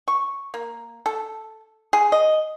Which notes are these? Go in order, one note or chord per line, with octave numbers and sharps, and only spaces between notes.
C#6
A#3
A4
G#4
D#5